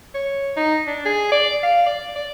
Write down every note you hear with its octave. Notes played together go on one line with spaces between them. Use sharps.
C#5
D#4
D4
G#4
D5
F5
D5
D5